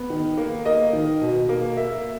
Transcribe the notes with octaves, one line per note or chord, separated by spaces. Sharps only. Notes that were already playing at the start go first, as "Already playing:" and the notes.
Already playing: B3
D#3
A#3
A#3 D#5
D#3
B2
A#3
A#3 E5